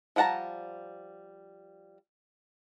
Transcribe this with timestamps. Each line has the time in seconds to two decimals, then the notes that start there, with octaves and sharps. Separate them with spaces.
0.16 F3 G3 F#5 A5 A#5